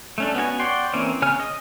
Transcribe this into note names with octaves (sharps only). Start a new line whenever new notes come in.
A3 C#4 D4
B3 C#4 F#4 G#5
C#5 D5 F#5 G5 C6
E3 A#3 C4 C#4
C#3 C#5 G#5 F6
D#5